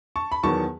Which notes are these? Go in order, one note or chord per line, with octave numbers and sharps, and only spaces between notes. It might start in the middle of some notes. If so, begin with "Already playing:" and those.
A5 C#6
B5
E2 D#3 F#3 B3 A5 C#6